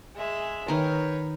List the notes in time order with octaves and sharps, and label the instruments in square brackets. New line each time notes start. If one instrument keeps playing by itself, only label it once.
[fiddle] G#3 E5
[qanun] D#3 A#4 [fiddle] B4 C#5